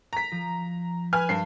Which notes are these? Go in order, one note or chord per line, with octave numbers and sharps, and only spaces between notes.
A#5 B6
F3
B4 G#5 F6
G2 C7